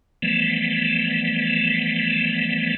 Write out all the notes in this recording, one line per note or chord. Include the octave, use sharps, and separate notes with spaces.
E3 F3 G3 A3 B3